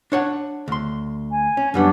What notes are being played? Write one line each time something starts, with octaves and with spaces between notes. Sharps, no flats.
D4 C#5 F#5
D2 C6
G#5
C#4
F#2 G3 B3 C#4 D4 F#5